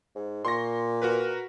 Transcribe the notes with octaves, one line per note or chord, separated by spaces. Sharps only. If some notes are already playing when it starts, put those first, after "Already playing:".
G#2
A#2 C6 C#6 A#6
F#4 A#4 B4